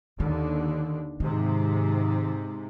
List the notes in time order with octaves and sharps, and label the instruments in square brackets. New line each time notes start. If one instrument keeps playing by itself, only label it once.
[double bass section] D#2 D3 [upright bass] D#3
[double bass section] G#2 C3 [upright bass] D#3